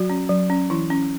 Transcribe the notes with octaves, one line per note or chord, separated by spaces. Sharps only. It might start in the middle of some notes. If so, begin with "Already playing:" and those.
Already playing: F#3 F#4
C#4
F#3
C#4
E3 E4
C#4